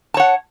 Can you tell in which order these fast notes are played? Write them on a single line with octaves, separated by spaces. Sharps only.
A5 C#5 F#5